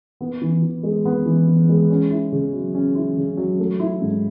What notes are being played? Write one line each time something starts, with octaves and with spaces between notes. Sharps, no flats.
B3
E3
E3
G#3
B3
E3
E3
G#3
C#4
E4
C#3
F#3
C#4
E4
C#3
F#3
A3
E4
G#2